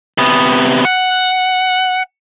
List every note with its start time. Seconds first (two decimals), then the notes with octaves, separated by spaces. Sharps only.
0.18 C3 B3
0.85 F#5